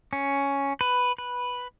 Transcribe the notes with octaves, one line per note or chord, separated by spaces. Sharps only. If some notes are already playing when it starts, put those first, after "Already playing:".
C#4
B4
B4